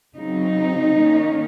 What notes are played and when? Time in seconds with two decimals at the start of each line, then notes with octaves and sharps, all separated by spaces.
0.16 C#3 F#3 C4 D#4
0.99 D#3 A#3 C#4